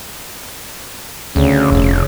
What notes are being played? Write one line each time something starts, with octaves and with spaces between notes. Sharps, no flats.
D2 C#3
F1